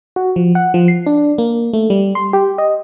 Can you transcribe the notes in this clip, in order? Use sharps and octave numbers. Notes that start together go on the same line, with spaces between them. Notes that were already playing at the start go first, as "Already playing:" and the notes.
F#4
F3
F#5
F3
C7
D4
A#3
A3
G3
C6
G4
D#5